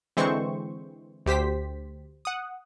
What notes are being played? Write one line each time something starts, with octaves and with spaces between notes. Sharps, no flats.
D3 E3 G#3 C4 C5 C#6
D2 G4 C5 B6
F#5 D#6